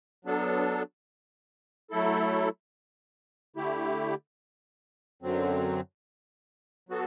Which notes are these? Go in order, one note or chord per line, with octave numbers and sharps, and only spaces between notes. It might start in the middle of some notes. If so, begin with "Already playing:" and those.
F#3 B3 D4 A4
F#3 A3 E4 A4
D3 A3 E4 G4
F#2 D3 F#3 C4
F#3 B3 F#4 A4